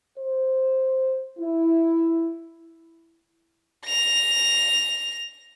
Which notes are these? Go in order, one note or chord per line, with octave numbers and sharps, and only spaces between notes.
C5
E4
A#6 F7